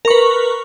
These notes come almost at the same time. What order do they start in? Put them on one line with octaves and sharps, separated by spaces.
A#4 C#6 B4